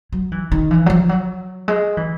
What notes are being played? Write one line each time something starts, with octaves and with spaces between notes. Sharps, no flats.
F#3
E3
D#3
E3
F#3
F3
F#3
G#3
E3